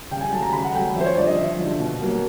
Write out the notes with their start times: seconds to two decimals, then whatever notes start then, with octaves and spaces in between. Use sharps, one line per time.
0.11 C#3 G5
0.21 G#5
0.33 F#3 A3 A5
0.42 A#5
0.53 C#3 B5
0.64 F#5
0.74 A3 G5
0.79 F#3
0.96 F2 C5 E5
1.06 C#5
1.17 D3 F3 D5
1.27 D#5
1.38 F2 E5
1.59 D3 F3
1.80 B2
2.01 F#3 A#3